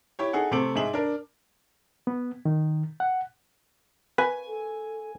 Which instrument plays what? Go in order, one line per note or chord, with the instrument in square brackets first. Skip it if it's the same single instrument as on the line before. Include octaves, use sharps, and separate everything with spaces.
[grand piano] E4 G4 C#5
D#4 G#4 A4 F#5
C3 A3 C5 D6 D7 F#7
G#2 G#3 G#4 E5 F#7
D4 A#4
[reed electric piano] B3
D#3
F#5
[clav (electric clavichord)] B4 [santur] G#5
[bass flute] A4